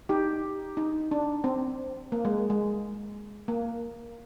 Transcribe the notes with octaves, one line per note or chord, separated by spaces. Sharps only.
D#4 G4
D#4
D4
C4
A#3
G#3
G#3
A#3